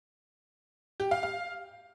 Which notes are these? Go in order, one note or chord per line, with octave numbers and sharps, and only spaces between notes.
G4
F5
F5